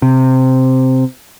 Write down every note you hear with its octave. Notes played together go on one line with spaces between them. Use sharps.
C3